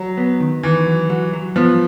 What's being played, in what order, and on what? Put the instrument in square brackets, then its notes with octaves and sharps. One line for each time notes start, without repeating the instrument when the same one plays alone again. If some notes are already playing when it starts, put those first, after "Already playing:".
Already playing: [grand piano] F#3
[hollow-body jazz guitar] B3
D#3
[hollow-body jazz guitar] D#3 [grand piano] E3
[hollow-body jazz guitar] F#3
F#3
F#3
[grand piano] F3 [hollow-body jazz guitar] B3